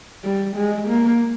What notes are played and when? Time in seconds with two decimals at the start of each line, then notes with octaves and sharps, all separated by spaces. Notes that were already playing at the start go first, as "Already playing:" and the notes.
0.25 G3
0.56 G#3
0.88 A#3